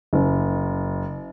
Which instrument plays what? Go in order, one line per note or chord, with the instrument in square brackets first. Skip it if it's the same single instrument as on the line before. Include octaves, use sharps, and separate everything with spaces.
[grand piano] F#1